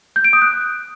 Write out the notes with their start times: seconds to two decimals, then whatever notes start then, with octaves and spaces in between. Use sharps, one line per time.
0.16 G6
0.25 D7
0.33 D#6
0.42 F#6